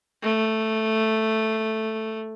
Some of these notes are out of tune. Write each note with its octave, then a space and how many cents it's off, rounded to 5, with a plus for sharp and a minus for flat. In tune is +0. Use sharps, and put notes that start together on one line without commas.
A3 +0